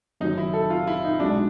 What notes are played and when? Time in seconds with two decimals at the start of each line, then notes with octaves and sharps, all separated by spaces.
0.20 F#1 F#2 D#3 F#3 D#4
0.37 E4
0.54 A4
0.70 F4
0.87 E4
1.04 D#4
1.20 B1 B2 G#3 D4